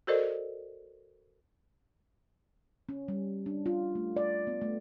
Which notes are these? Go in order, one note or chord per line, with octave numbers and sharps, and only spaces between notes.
F#4 A4 A#4 C5 D5 D#5
C#4
G3
D4
F4
A3
D5
B3
A3